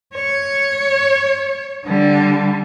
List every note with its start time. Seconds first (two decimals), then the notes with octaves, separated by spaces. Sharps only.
0.15 C#5
1.86 D3 G3